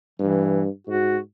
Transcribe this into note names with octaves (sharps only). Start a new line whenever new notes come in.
G2 E3
G#2 F#4